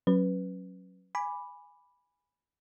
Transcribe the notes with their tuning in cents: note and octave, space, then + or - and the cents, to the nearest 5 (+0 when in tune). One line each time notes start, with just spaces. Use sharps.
F#3 +0 C#4 -15 B4 +0
G#5 -5 B5 +0 D6 +0